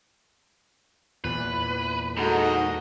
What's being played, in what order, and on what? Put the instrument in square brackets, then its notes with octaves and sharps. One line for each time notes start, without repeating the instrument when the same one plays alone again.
[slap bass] E2 A#2 E3 [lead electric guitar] B4
[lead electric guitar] G#2 [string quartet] F#4 A#4 [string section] A4 D#5